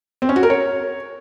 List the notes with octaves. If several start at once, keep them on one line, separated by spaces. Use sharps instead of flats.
C4
C#4
F#4
A#4
C#5